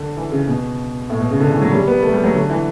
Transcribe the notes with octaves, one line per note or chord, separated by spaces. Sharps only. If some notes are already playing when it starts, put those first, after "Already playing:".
Already playing: D3
E3
C#3
B2
A2
B2
C#3
D3
E3
F#3
G3
B3
A3
G3
F#3
D3
E3